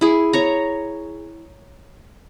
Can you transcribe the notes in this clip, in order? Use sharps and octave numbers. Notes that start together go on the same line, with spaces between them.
E4 G#4
C#5 A#5